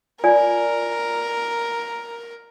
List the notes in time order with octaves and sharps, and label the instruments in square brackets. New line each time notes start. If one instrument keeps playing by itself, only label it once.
[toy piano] F4 D5 G#5 [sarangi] A#4